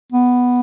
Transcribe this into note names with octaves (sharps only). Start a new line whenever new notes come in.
B3